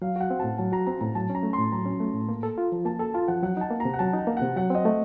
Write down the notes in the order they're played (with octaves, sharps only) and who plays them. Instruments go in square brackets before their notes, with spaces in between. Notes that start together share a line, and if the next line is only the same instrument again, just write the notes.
[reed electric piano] F#3 [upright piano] F5
[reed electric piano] F#4 [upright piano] F#5
[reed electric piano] C4
[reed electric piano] A2 [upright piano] A5
[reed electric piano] F#3 [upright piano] A5
[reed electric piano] F#4 [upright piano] A#5
[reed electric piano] C4 [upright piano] A#5
[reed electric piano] A2 [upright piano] A#5
[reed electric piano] F#3 [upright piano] A5
[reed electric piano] C#4
[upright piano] A#5
[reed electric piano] A3
[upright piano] C6
[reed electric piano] A2
[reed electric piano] F#3 [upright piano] A#5
[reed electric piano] C#4
A3
A2
A#3
A4
F4
F3
[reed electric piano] A#3 [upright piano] A5
[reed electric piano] A4 [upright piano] A5
[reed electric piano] F4 [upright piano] A5
[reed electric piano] F3 [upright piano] F#5
[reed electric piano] F#3 [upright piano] F#5
[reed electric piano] D#4 [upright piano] A5
[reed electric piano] A#3
[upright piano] A#5
[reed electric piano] C3
[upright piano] F#5
[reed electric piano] F#3 [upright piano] A5
[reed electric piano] D#4
[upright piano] A5
[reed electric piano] A#3
[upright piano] F#5
[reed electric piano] C3
[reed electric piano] F#3 [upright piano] F#5
[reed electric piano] C4 [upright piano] D#5
[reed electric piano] A3